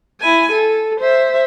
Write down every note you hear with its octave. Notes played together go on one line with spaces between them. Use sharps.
E4 G#5
A4
C5 E5